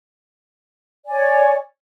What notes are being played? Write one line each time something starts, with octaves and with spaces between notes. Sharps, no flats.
C#5 D5 G#5